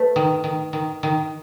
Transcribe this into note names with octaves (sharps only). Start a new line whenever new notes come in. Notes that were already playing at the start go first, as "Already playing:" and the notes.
Already playing: A3 B4
D#3
D#3
D#3
D#3